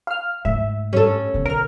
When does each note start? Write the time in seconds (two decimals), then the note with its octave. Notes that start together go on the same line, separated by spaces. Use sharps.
0.07 F5 F6
0.45 G#2 A3 E5
0.93 G2 C#4 A4
1.34 B1 D3
1.46 A#4 F6